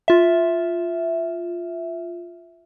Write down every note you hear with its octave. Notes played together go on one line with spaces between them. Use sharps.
F4 E5